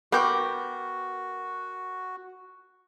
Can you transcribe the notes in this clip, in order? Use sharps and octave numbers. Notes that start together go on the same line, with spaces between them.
B3 F#4 G4 A#4 G5 C#6 D6 G6